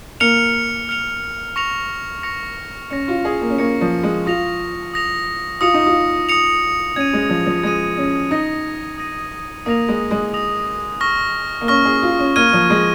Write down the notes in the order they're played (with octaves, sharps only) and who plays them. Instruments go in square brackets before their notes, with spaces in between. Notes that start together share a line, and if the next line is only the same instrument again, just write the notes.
[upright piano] A#3 [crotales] F6 C#7 F7
[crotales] F6 C#7 F7
C#6 A#6 C#7 F7
C#6 A#6 C#7 F7
[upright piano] C#4 [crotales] C#6 A#6 C#7
[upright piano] F4
G#4
A#3
C#4
[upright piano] A#3 [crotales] C#6 A#6 C#7
[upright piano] F3
G#3
[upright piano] F4 [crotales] D#6 A#6 F7
[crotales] D#6 A#6 F7
[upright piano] F4 [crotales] D#6 C#7 F7
[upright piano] D#4
F4
[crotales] D#6 C#7 F7
[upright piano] C#4 [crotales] G#6 D#7
[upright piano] G#3
F3
F3
[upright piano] G#3 [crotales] G#6 D#7
[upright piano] C#4
[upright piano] D#4 [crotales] D#6 A#6 D#7
[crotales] D#6 A#6 D#7
[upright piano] A#3 [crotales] D#6 A#6 F7
[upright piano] G#3
G#3
[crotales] D#6 A#6 F7
C#6 F6 A#6
[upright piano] A#3
[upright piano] C#4 [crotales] C#6 F6 A#6
[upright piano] G#4
F4
C#4
[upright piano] A#3 [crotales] F6 G#6 D#7
[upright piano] F3
G#3